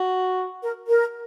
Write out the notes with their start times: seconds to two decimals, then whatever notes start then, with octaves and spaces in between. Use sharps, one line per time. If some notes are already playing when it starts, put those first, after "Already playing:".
Already playing: F#4
0.61 A#4
0.87 A#4